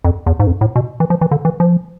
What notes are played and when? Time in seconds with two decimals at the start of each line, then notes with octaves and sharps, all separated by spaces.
0.04 F2
0.26 E2
0.39 G#2
0.47 F2
0.61 A2
0.76 B2
1.00 E3
1.10 F3
1.21 E3
1.31 D3
1.45 E3
1.60 F3